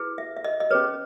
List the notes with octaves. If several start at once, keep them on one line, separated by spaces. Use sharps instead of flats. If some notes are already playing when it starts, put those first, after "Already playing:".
Already playing: E4 G#4 B4
E5
E5
D#5
D#5
C#4 G#4 B4 C#5